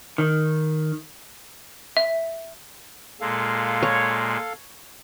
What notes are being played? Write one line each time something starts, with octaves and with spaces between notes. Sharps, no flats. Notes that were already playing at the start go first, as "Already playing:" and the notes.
D#3
E5
A#2 G#3 A4 F5
C#5